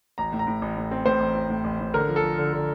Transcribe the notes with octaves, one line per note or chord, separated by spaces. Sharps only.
A1 A#5
A2
A#5
A2
A1
A2
C4
A2 C5
A1
C4
A2
A1
A2
D3 A#4
F3
A4
F3
D3
D3